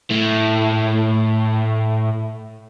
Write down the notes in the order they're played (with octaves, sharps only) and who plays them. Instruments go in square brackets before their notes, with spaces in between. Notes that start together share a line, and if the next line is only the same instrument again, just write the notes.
[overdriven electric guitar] A2 A3